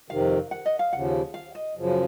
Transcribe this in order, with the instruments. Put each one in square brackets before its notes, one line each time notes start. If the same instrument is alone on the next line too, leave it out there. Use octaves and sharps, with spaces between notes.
[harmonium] F2 C3 D#3 [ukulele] F5
[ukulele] F#5
D#5
F5
[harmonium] D#2 C#3 F3 [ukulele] F#5
[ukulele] F5
D#5
[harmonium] F#2 C#3 F3